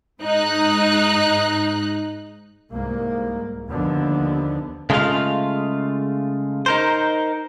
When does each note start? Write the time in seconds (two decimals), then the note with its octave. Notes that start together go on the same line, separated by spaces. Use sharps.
0.21 G#2 D#4 F#6
2.72 C2 G#2 A#3
3.70 D#2 D3 F3 B3
4.90 C#3 G#3 A3 D4 F4 F5
6.66 D#4 A#4 C5